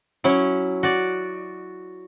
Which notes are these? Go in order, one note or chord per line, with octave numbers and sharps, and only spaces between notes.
F#3 C#4 E4
F#4 D5